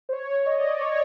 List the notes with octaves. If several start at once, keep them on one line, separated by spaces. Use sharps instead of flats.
C5
C#5
D#5
D5
C#5